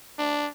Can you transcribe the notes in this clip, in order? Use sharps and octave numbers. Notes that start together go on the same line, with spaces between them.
D4